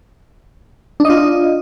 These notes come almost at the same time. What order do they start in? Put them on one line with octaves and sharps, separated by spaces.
D4 D#5 F4